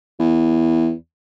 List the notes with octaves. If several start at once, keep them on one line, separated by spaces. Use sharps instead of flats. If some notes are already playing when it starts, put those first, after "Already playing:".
E2